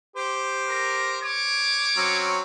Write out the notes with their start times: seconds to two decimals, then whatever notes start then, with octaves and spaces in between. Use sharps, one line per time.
0.16 G4 C5
0.69 A#4
1.23 C#5 D6
1.97 F#3 C4 C#4